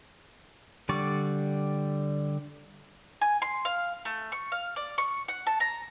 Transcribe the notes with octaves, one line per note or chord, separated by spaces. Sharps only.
D3 G3 D5 C#6
G#5
C6
F5
A3
C#6
F5
D5
C#6
F#5
A5
A#5